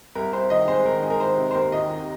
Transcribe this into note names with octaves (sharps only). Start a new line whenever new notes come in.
C2 A#4
C2 C5
D#3 D#5
G#3 C5
D#3 A#4
G#3
A#4
D#3 C5
C3
C5
D#2 A#4
D#3 D#5
D#3